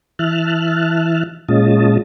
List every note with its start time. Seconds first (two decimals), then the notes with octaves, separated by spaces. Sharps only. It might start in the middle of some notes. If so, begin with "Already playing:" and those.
0.19 E3 E5 A5 F6 F#6
1.49 A#2 G#3 C#4 F4 D#5 A5